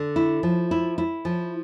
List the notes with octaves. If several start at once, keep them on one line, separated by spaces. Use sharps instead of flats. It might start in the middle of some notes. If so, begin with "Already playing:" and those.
Already playing: D3
E4
F3
E4
E4
F3